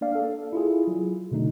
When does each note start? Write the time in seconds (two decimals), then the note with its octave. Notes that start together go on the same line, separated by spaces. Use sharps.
0.01 A#3 D4 D5 F5
0.15 A4
0.53 E4 F4 G#4
0.87 F#3
1.31 B2 D3 A3 D#4